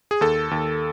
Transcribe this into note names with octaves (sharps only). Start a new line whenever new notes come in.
G#4
D#2 A4
D#2